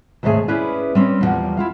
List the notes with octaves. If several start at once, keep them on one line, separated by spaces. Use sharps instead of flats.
D#2 G#2 C3 A3 G#4 G#5
C#4 E4 G#4 B4 D5
G3 C4 C#4
E2 A2 F3 G3 A#3 F#5
E4 F4 F5